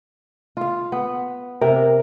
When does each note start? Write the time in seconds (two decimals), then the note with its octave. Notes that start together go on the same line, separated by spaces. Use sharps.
0.57 F4 F5
0.92 B3
1.61 C3 A#4